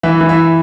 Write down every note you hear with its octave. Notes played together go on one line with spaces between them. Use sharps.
E3 E5
E3
E5